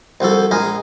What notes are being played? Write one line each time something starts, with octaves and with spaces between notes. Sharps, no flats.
C2 F3 F#4 A4
A#1 G#3 A#4 D#5 G#5